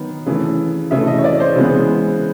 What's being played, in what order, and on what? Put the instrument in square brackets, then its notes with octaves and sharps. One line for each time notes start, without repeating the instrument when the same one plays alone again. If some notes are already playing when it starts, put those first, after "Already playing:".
Already playing: [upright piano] D#3 F#3 B3
C#3 E3 A3
C#3 E3 A3 E5
D#5
C#5
D5
C5
C#3 E3 G#3 B3